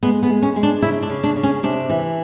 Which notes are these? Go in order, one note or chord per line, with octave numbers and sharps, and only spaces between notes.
G#3 B3
B3
G#3
C#4
G#3
D4
C#3 E4
D4
C#3
D4
C#3
C#4
C3 D4
E3